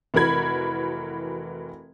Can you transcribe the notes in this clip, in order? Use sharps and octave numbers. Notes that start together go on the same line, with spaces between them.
F1 E3 F#4 A#4 B5 G#6